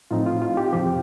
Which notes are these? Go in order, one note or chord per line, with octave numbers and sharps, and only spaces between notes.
A2 F3 C4 D#4 F4
F4
F4
G4
F2 C3 F3 G4